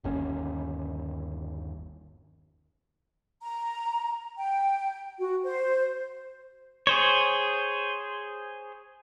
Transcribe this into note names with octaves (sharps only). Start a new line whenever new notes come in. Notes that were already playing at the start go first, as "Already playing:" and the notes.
G1 D#2 C#4
A#5
G5
F#4
C5
G#4 C5 C#5